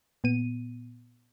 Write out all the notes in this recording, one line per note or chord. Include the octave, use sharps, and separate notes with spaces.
A#2 B3 D#7